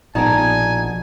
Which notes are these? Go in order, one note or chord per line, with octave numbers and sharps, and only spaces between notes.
A#1 B2 D#4 A#4 D5 G#5 A5